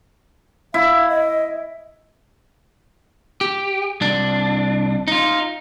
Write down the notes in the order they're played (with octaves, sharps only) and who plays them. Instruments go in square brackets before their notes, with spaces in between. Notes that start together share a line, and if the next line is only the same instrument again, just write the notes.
[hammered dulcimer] E4 [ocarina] F5
[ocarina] D#5
[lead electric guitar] G4
C2 D4
D#4 F4